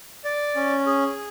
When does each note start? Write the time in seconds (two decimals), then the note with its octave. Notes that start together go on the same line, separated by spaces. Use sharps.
0.24 D5
0.56 C#4
0.86 G#4